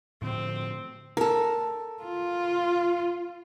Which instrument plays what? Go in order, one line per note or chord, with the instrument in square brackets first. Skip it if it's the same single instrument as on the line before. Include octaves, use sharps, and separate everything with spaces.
[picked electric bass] A2 D3 F3 [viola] C4
[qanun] A4 A#4
[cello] F4